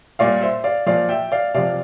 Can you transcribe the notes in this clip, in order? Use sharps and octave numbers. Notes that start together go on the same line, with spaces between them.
A#2 G3 D5 F5
C5 E5
D5 F5
A#2 F3 D5 F5
E5 G5
D5 F5
C3 F3 D5 F5